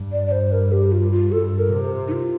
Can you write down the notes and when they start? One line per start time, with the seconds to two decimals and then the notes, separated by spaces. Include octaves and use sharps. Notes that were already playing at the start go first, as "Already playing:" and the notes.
Already playing: G2
0.12 D5
0.27 D5
0.31 C5
0.52 A#4
0.72 G4
0.92 F4
1.12 F4
1.32 G2 A4
1.59 A#4
1.72 C3
2.08 D#4
2.12 F4